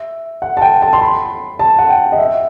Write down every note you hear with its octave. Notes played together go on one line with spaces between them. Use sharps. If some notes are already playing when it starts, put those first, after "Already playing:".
Already playing: E5
F#5
A5
G5
A5
C6
B5
A5
F#5
G5
D#5
E5